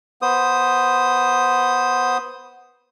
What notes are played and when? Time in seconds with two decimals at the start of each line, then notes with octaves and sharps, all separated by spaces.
0.22 B3 C5 D#6